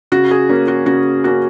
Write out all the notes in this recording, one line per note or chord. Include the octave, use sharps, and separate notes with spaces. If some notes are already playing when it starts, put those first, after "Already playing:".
C#3 F#4
G#4
A#3 C#4
F#4
C#3 F#4
A#3 C#4 F#4